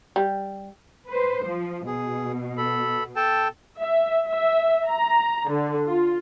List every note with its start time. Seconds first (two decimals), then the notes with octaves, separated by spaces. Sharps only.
0.16 G3
1.08 B4 C5
1.44 F3
1.86 B2 G#4
2.57 A4 B5
3.16 A4 G5 A5
3.79 E5
4.28 E5
4.89 A#5
5.51 D3
5.85 F4